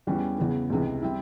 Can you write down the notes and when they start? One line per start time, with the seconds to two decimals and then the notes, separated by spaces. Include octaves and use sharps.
0.07 E2 E3 G3 C#4
0.38 E2 C#3 E3
0.70 C#2 C3 E3
1.02 G3 C4 E4